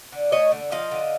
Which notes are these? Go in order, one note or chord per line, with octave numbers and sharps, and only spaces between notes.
D3
A3 C#5 D#5
D3
F3 D#5 F5
D3